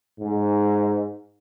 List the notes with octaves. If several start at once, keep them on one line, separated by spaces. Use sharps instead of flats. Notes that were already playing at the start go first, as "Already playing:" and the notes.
G#2